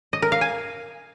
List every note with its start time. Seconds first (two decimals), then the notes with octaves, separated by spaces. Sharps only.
0.13 D#5
0.22 A#4
0.32 F5
0.41 G#5